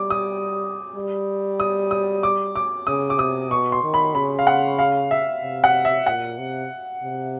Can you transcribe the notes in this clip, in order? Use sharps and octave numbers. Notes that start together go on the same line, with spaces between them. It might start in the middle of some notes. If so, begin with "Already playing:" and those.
Already playing: G3 D6
D#6
G3
D#6
D#6
D6
D6
C#3 D#6
D6
C3 D#6
B2 C#6
C6
D#3
B5
C#3 B5
F5
F#5
F5
E5
C3
F#5
E5
A#2 F#5
C3
C3